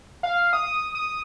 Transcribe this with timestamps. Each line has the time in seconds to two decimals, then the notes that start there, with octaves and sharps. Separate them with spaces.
0.23 F5
0.53 D#6
0.95 D#6